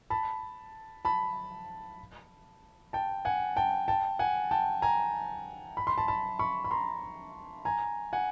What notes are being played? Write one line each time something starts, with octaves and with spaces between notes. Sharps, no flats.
A5 B5
A5 B5
G5 A5
F#5 G#5
G5 A5
G5 A5
F#5 G#5
G5 A5
G#5 A#5
B5
C6
A5 B5
A5 B5
B5 C#6
B5
A#5 C6
G#5 A#5
F#5 G#5